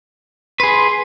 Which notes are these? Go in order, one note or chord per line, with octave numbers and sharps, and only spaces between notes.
G#4 B4 C6